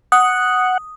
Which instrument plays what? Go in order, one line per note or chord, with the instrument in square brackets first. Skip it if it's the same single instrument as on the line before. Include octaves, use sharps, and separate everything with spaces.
[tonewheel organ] F#5 [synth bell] D#6